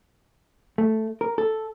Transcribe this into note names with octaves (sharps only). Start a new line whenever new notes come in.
A3
A#4
A4